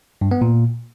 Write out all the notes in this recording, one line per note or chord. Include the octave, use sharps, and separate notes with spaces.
G2
B3
A#2